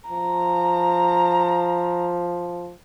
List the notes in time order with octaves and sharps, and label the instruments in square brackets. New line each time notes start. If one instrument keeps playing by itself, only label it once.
[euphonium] F3 [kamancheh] A#5